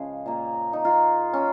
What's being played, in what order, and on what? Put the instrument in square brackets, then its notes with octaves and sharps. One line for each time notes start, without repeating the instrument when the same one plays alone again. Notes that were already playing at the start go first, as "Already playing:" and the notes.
Already playing: [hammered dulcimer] C#3 F3 G#3 G#4
A#2 A#3
D#4
F4
C#4